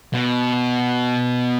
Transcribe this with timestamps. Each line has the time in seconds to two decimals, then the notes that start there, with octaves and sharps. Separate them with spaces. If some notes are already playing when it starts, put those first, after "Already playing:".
0.14 B2